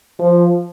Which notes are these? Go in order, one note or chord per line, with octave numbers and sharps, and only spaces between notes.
F3